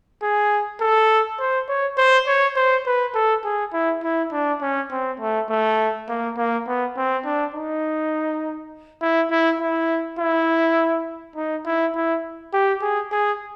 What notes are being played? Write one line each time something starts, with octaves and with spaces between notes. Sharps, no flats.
G#4
A4
C5
C#5
C5
C#5
C5
B4
A4
G#4
E4
E4
D4
C#4
C4
A3
A3
A#3
A#3
B3
C4
D4
D#4
E4
E4
E4
E4
D#4
E4
E4
G4
G#4
G#4